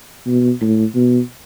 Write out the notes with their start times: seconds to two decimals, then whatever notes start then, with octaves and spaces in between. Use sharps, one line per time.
0.27 B2
0.61 A2
0.95 B2